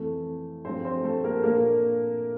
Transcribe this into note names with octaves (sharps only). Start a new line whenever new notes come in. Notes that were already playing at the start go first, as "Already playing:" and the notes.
Already playing: F2 E3 A3 A4
G2 F3 A3 C4 C5
C4 C5
A3 A4
A#3 A#4
A#2 A3 A#3 D4 A#4